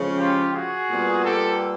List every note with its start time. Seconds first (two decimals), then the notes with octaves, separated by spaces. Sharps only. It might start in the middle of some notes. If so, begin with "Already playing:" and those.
Already playing: C#3 F3 G#3 C#4
0.18 F4 G4
0.53 F#4 G#4
0.89 A#2 G3 B3
1.24 G4 A4